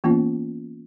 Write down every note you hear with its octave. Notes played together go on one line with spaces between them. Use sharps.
E3 A#3 B3 C#4 F4